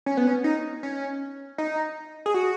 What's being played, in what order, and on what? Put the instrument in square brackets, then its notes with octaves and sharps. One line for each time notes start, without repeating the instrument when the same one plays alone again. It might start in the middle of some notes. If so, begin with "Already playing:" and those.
[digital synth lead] C#4
B3
C#4
D#4
C#4
D#4
G#4
F#4